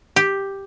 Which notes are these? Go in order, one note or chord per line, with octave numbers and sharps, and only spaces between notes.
G4